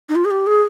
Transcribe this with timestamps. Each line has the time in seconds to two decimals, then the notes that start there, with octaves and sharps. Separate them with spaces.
0.09 D#4
0.15 F4
0.25 G#4
0.31 G4
0.47 G#4